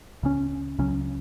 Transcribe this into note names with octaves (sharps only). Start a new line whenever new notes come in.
C#2 C#3 F#3 C#4
C#2 C#3 F#3 C#4